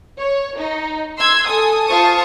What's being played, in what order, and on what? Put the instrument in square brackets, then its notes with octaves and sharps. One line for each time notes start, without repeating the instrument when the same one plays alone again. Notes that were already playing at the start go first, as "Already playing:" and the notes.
[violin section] C#5
D#4
C6 E6 G#6
A4 G#5 D#6
F4 C5 A5 C#6 D#6